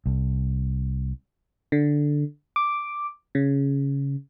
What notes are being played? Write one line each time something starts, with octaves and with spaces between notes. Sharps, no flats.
C2
D3
D6
C#3